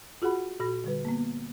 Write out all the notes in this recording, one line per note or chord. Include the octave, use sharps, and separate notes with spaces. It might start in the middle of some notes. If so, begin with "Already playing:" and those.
F4 F#4 G#4 F#5 B5
A#2 F#4 B5 A#6
D3 G3 B4
A#3 B3